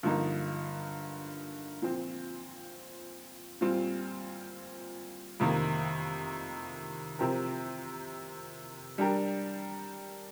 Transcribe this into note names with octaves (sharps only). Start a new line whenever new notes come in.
G2 D3 F3 A#3 D#4
A#2 F3 C4
A#2 G3 C4 F4
F2 C3 D#3 A#3
C3 F3 C4 G4 A#4
G3 D4 G4 A#4